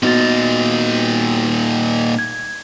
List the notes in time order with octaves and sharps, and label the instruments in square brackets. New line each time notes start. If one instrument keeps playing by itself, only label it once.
[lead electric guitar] A#2 D#4 [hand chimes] B3 F#4 A6
[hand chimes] G#6